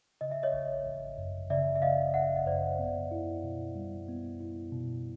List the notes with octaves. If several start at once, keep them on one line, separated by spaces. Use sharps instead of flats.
C#3 D#5
E5
C#5 D#5
G#1
G#1
F#2
C#3 D5 E5
E5
G#1 D#5 F5
G#1 E5 F#5
D#5
F#2 C5 D5
B3
E4
B2
G3
B3
E4
B2